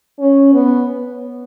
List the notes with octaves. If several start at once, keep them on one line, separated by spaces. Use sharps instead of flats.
C#4
B3